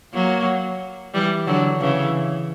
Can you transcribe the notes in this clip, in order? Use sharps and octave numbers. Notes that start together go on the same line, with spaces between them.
F#3 A#3
E3 G3
D3 F#3
C#3 E3